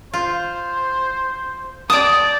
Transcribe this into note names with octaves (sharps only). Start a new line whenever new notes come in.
F4 C5
D5 G5 A5 D#6